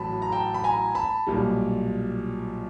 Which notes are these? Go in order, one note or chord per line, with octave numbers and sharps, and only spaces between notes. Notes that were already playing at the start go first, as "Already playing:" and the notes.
Already playing: A1 A2 F#3 A5 B5
A#5
G5 A5
B5
G#5 A#5
A5 B5
B1 A#2 G3